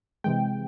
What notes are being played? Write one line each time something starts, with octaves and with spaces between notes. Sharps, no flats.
C3 E3 G#3 G5